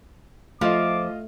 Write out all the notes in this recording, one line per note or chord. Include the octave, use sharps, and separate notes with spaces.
F3 A3 F4 D#5 D6